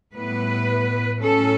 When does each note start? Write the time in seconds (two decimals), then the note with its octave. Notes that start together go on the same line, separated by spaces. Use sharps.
0.15 A2 G3 B3 E4 B4
1.21 A2 F#3 C#4 A4